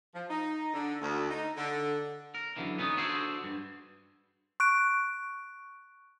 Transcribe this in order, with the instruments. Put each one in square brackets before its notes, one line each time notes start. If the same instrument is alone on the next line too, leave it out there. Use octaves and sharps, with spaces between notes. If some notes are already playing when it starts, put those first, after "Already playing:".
[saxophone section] F3
D#4
D3
D2
D#4
D3
[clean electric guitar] A#4
F#2 D3 E3
B3 C#4 D#4
D4 F#4 G#4 A4 C5
G2
[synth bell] C#6 F#6 D7